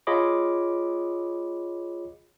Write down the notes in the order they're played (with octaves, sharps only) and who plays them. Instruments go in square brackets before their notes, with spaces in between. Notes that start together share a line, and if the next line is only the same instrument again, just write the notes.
[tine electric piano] F4 G#4 C#5 D#5 B5 D6